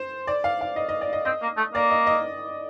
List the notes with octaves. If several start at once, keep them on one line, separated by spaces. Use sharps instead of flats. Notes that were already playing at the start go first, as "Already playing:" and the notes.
Already playing: C5
D5
F5
F5
D#5
D#5
D5
D#5
C4 D#5
A#3
A3
A#3 D5
D#5
D#5